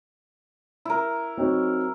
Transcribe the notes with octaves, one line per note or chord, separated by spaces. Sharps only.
E4 A#4
F#3 C4 D#4